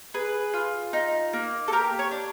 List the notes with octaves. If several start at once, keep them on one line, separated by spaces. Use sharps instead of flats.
G#4 B4
F4
D#4
A#3
A4
G4 A#4
C#5
D4